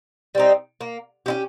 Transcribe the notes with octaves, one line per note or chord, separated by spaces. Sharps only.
G3 C4 D#4
A#3
C#4 E4 G4